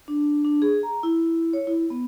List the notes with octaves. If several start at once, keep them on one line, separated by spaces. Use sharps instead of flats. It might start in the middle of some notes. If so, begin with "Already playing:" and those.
D4
D4
G#4
A#5
E4
C#5
E4
B3